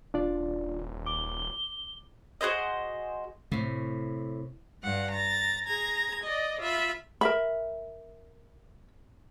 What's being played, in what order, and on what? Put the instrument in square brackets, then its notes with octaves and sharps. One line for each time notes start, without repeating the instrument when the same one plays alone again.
[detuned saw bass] D#1 [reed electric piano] D4 F4 D5
[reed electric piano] D6 [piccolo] G7
[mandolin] F#4 G#4 C5 D#5
[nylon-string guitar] A2 A3 [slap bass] C3
[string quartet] G2 F5 F#5
A#5 A6
G#4 A#5 G#6
D5 D#5
F4 E5 B5
[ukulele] A#4 E5 B5